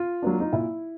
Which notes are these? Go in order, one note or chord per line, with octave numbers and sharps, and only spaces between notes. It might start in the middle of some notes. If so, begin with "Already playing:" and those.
Already playing: F4
F#3 A#3 D4
D#4
A#2 E4